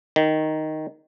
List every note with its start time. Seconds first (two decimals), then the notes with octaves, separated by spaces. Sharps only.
0.16 D#3